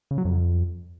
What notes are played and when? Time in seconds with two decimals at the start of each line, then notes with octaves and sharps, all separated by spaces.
0.11 C#3
0.18 F#3
0.25 F2